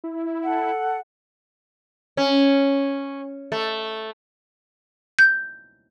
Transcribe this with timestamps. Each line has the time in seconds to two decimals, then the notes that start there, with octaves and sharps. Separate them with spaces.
0.04 E4
0.43 A4 F#5
2.17 C#4
3.52 A3
5.19 G6